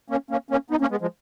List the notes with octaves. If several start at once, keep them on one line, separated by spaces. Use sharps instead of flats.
A#3 C#4
A#3 C#4
A#3 C#4
B3 D#4
A#3 C#4
G#3 B3
F3 G#3